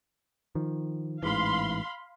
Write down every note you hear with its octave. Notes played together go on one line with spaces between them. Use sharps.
D#3 F3
A1 G#2 E3 F5 B5 C6